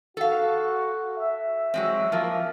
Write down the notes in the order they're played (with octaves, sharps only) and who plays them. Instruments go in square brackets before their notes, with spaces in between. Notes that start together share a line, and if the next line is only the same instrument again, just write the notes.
[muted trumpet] F#4 [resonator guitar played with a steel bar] A4 F5
[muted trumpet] E5
[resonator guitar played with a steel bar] F#3 G#3 C4
F3 A#3